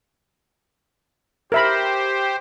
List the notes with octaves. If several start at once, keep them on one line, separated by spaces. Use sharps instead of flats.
G4 A#4 C5 E5 B5